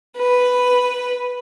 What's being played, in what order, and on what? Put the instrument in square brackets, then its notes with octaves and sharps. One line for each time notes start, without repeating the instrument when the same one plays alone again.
[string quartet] B4